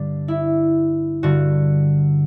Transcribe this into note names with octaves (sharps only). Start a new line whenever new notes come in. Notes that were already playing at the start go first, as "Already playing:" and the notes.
Already playing: G2 D3 D4
E4
G2 D3 F#4